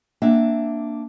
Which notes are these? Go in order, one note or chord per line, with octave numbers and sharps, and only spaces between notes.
A#3 C4 D4 E5 F#5